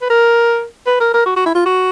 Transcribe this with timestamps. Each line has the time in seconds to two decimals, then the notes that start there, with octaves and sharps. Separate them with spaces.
0.02 B4
0.10 A#4
0.87 B4
1.00 A#4
1.14 A#4
1.26 F#4
1.36 F#4
1.46 E4
1.55 F4
1.66 F#4